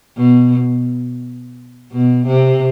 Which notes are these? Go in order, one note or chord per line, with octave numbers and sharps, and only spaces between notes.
B2
B2
C3